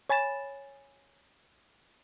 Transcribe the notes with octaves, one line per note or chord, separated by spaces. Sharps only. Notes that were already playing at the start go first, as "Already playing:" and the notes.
C#5 G#5 B5 A6 E7